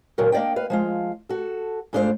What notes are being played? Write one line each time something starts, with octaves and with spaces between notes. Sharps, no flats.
D#2 A#2 C#3 F#3 A#4
A#3 D4 D5 D#5 G5
B4 F5
F3 G#3 F4
F#4 A4
G#2 A3 D4 F4 G4 C5